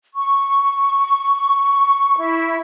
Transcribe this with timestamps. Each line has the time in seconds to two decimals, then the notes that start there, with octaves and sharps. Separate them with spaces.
0.14 C#6
2.17 E4